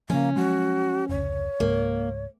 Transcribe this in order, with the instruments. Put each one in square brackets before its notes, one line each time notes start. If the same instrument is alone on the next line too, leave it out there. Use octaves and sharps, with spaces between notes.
[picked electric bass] C#3 F3 [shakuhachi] A#3 [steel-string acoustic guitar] C#4
[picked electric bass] F3 F#3 G#3 [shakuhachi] F#4
[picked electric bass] F1 C#2 [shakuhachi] C#5
[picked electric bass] C#2 G#2 [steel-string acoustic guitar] A#3